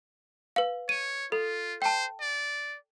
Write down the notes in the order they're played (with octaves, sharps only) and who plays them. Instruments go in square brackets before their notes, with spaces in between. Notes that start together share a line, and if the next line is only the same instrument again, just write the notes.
[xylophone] B4 F5
[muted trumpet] C#5 [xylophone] D#7
[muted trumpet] F4 [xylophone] A4
[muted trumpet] C5 [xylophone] G5 A5
[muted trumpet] D5